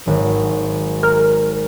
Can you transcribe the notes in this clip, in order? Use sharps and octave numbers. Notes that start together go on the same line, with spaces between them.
G#1 F#3
A#4